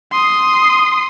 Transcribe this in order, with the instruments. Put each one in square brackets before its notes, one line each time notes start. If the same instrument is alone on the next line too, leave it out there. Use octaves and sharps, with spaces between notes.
[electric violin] C6 D#6